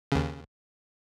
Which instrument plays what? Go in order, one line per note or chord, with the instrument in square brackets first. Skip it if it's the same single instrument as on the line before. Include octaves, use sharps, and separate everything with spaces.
[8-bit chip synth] D#2 C#3